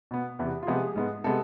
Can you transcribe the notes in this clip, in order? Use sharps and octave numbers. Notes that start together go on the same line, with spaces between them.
B2 B3
E2 C3 E3 B3
F4
C3 F3 G#3 B3 G#4
G#2 G#3 B3
C3 G#3 B3 A4